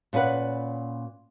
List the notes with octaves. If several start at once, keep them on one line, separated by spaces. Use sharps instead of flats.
A#2 C#4 F4 B4 F#5